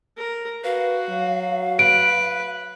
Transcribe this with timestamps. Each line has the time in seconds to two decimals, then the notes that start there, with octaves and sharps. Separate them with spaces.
0.17 A#4
0.64 F#4 B4 F5
1.10 F#3
1.79 B4 D7